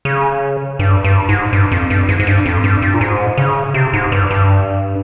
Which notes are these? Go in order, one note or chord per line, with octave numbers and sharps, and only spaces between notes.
C#3
G2
G2
G#2
G2
F2
G2
G#2
G#2
G2
F2
G2
G2
A#2
G#2
C#3
C3
G#2
G2
G2